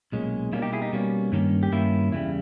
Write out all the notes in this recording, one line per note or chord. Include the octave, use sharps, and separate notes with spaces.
B1 A#2 G#3 C#4
B2 G3 A#3 C#4 E4
D#4 G4
E4 G#4
D#4 G4
B2 G3 A#3 C#4
G2 D#3 A#3 C#4
G4
G2 D#3 A#3 C#4 E4
E2 C#3 G3 E4